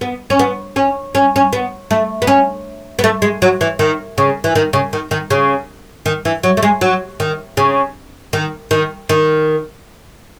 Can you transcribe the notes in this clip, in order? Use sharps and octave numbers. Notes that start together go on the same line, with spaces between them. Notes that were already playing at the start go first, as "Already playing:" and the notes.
B3
C#4
B3
C#4
C#4
C#4
B3
A3
B3
C#4
B3
A3
G#3
F#3
E3
D#3
C#3
E3
D#3
C#3
D#3
D#3
C#3
D#3
E3
F#3
A3
G#3
F#3
D#3
C#3
D#3
D#3
D#3